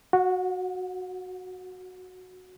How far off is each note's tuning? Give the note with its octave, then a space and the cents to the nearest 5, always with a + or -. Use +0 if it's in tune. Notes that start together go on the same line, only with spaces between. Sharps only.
F#4 -5 F#5 -45